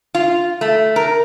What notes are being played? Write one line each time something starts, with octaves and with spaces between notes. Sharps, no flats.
F4
A3
A#4